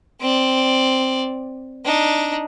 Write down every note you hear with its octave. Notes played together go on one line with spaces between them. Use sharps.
C4 D5
D4 D#4